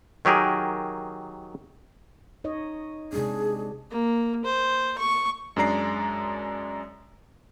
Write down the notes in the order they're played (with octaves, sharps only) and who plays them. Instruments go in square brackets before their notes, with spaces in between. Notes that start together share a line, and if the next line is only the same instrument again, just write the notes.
[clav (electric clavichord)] D#3 F#3 G4 G#4 A#4
[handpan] D#4 C#5 D#5
[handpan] C3 G#3 D4 [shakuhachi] G#4
[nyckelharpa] A#3
C5
C#6
[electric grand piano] F#2 G#3 D4 D5 A#5 C7